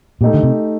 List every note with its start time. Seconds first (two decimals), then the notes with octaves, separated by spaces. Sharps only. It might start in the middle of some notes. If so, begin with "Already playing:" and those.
0.21 A#2 A3 D#4 G4
0.34 D3
0.43 C3